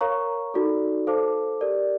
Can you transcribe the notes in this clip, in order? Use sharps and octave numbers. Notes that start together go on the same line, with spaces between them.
A#4 C#5 F5 A#5 C#6
D#4 F#4 A4 D5
A4 C5 F5 A5 D6
G4 A#4 D5